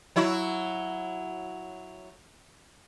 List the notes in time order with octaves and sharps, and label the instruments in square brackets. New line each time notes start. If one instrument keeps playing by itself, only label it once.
[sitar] F#3 E4 F#4